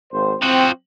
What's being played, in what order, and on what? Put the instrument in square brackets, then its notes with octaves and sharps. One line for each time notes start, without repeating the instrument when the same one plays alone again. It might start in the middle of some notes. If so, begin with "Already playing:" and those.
[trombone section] G#1 C5
[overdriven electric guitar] F3 F#4 [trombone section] C4